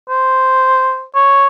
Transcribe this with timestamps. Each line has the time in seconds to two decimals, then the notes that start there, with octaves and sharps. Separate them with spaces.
0.09 C5
1.15 C#5